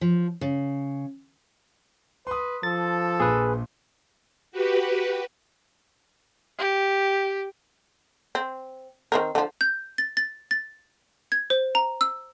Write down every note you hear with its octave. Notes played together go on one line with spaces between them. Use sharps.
F3
C#3
B4 C6 D#6
F3 A4 A6
A#1 A#2 G#4 B4
F#4 G4 B4
G4
C4
D#3 C4 A#4
D3 F3
G6
A6
A6
A6
G#6
C5
A#5
E6